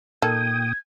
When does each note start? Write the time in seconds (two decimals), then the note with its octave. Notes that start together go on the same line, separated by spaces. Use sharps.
0.22 A#2 D#3 A4 G5 D#6 G#6